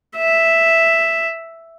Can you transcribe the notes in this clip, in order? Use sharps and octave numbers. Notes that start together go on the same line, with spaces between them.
E5